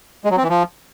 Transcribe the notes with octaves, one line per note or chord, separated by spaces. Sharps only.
G#3
F#3
C4
E3
F3